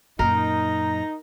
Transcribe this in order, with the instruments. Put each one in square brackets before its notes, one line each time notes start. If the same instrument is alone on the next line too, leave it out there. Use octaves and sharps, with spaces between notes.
[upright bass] F#2 A#2 [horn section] D#4 [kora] A#4 [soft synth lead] A#5